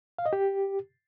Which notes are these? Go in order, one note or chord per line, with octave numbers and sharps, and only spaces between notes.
F5
D#5
G4